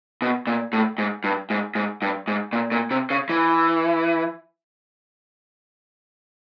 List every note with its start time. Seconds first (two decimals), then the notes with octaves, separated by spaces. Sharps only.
0.22 B2
0.47 A#2
0.73 A2
0.98 G#2
1.24 G2
1.50 G#2
1.75 G#2
2.02 G2
2.28 G#2
2.53 A#2
2.72 A#2
2.91 C3
3.10 C#3
3.29 E3